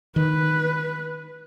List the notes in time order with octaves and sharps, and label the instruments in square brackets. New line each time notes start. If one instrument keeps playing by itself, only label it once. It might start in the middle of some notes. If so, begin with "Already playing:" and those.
[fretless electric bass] D#3 [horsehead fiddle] B4